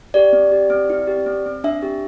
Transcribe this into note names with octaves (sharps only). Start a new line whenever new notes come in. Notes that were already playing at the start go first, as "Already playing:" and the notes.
G4 D5
C4
G4
C4
E4
G4
C4
C4
D4 E5
G4